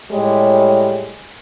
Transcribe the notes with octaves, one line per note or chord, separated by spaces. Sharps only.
A2 G3 G#3 C#5